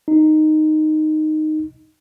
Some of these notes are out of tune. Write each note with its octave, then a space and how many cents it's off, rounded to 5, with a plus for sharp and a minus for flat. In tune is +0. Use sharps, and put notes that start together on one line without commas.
D#4 -10